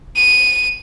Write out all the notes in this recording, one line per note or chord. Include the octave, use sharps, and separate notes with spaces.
D#7